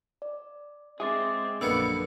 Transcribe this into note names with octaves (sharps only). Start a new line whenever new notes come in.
D5
G#3 C4 G#4 E5 D6 A6
A#1 F#2 D3 G3 A#3 B3 E6 C#7